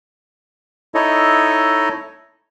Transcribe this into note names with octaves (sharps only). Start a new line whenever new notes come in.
D#4 E4 A4 C#5 D#5